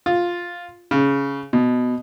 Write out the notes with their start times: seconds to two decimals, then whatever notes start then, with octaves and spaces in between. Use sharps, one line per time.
0.06 F4
0.91 C#3
1.53 B2